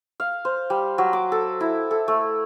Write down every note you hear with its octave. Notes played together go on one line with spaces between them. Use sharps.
F5
C5
G3
F#3
D6
A4
E4
A4
A3